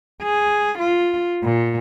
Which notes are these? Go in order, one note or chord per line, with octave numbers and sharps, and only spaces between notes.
G#4
F4
A#2